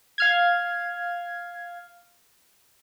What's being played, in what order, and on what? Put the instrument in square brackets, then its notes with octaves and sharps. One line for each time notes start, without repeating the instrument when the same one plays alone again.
[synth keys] F5 F6 G#6